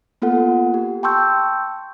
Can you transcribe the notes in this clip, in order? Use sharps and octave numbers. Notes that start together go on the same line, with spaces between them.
A#3 B3 F4 A4 F#5
G4
G5 A5 C6 C#6 E6 G6